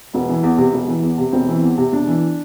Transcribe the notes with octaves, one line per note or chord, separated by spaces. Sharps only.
E1 B3
E3
E2
C3
E1
E3
E2
C3
E1 C4
E3
E2
C3
E1 D4
E3